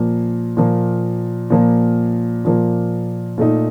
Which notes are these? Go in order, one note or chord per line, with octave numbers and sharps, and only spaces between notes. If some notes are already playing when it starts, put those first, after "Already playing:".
Already playing: A#2 F3 A#3
A#2 F3 A#3
A#2 F3 A#3
A#2 F3 A#3
A#2 A3 D#4